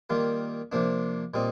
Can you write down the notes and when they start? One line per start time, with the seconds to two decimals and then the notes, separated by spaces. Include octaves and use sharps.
0.10 D#3 G3 A#3 F4
0.72 C3 F3 A#3 D4
1.34 A#2 G3 C4 D#4